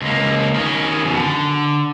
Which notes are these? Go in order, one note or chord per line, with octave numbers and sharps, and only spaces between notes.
C#2 A#3
D#3 C#4
F#2 B2
D3